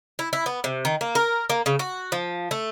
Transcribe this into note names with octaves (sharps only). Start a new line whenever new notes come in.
E4
E4
B3
C3
D#3
A#3
A#4
A#3
C#3
F#4
F3
A3